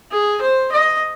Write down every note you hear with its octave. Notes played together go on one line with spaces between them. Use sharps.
G#4
C5
D#5